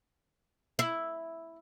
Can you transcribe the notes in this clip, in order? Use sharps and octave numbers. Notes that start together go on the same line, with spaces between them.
E4